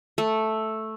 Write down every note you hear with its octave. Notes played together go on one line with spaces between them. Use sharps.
A3